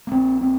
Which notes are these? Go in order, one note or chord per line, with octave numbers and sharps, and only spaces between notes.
A#3
A#1 A#2 C4
C4